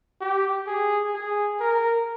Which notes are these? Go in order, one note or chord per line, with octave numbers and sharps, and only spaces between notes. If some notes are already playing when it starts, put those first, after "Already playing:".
G4
G#4
G#4
A#4